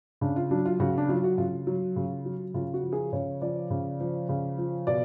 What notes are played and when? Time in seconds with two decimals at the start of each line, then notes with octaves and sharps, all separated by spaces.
0.21 C#3 D4
0.36 F4
0.51 F#3 D4
0.65 F4
0.80 C#3 F#4
0.98 D4
1.09 F#3 F4
1.24 F#4
1.38 C#3 F4
1.67 F#3
1.96 C#3
2.25 F#3
2.54 C#3 F4
2.74 F#4
2.83 F3
2.93 G#4
3.13 C#3 C#5
3.42 F3 D5
3.70 C#3
4.00 F3
4.29 C#3
4.58 F3
4.87 B2 D5